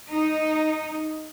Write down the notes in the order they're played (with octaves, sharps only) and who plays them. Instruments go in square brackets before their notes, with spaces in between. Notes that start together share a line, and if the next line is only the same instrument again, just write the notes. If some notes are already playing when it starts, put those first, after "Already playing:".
[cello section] D#4